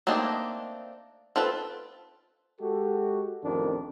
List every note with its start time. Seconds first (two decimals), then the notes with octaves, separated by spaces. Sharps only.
0.07 A3 A#3 C4 D4 D#4
1.36 C4 F4 A4 B4
2.61 G#3 F#4 G4 A4
3.44 A1 F2 D#3 D4 A#4